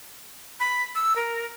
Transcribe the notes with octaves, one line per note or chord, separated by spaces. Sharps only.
B5
E6
A#4